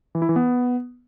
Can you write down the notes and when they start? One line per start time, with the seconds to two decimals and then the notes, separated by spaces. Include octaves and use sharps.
0.15 E3
0.22 E4
0.29 E3
0.36 B3